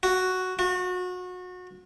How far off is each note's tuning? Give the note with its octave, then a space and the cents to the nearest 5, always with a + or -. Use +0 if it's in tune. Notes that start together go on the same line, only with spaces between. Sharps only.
F#4 +0
F#4 -30